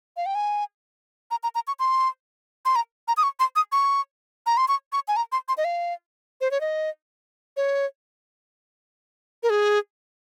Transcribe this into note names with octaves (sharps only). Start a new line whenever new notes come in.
F5
G5
G#5
A#5
A#5
A#5
C#6
C6
C6
A#5
A#5
D#6
C#6
C6
D#6
C#6
A#5
C6
C#6
C#6
G#5
A#5
C6
C6
D#5
F5
C5
C#5
D#5
C#5
A#4
G#4